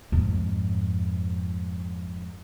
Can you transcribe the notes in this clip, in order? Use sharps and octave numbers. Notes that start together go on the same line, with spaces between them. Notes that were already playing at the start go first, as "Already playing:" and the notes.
F2 G#2